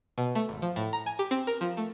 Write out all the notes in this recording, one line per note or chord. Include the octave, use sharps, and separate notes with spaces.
B2
A3
G#1
F3
A2
A#5
G#5
G4
C4
A#4
F3
A3